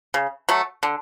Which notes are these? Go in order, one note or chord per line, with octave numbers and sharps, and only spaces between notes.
C#3
F#3 A3
D3